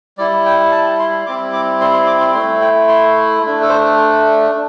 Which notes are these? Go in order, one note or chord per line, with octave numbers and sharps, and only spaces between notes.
G3 E4 D5
G5
A5
C6
G3 C4 E4 D6
D6
C6
C6
D6
C6
A3 E4 C6
G5
C6
A3 D4
A4
C5